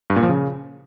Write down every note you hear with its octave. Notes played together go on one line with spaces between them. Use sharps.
G2
A#2
F3
C#3